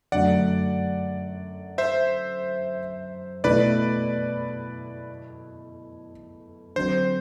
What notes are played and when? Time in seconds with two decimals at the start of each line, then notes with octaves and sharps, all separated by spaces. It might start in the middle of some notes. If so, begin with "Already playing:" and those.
0.12 F#2 D3 F#3 A3 D5 F#5
1.78 C5 E5
3.44 B2 A3 E4 B4 D5
6.76 D3 F#3 C4 C5